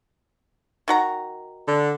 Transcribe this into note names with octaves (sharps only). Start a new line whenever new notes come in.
D#3 F#4 A#5
D3